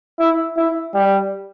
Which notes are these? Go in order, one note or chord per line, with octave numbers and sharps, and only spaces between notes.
E4
E4
G3